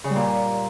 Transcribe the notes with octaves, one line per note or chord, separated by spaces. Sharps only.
C#3
G3
A#2